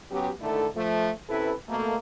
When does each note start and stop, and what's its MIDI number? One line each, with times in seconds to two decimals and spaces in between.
0.11 0.30 54
0.11 0.30 59
0.11 0.30 61
0.11 0.30 67
0.41 0.67 44
0.41 0.67 50
0.41 0.67 51
0.41 0.67 57
0.41 0.67 64
0.41 0.67 69
0.75 1.09 53
0.75 1.09 57
1.29 1.53 48
1.29 1.53 61
1.29 1.53 64
1.29 1.53 69
1.29 1.53 71
1.68 1.94 47
1.68 1.94 57
1.68 1.94 58